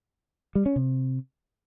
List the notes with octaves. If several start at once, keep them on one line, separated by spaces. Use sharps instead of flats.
G3
C#4
C3